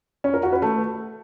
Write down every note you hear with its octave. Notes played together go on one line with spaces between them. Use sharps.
C#4
A#4
F#4
B4
A3